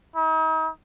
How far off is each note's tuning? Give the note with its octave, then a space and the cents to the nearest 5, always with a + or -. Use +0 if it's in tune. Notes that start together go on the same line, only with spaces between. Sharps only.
D#4 +40